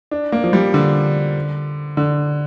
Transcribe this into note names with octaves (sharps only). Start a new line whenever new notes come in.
D4
A#3
F3
G3
D3
D3